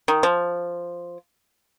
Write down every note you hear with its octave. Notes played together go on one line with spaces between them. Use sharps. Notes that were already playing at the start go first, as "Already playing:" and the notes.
D#3
F3